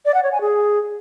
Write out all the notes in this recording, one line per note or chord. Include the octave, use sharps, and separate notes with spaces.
D5
F#5
C#5
G#5
G#4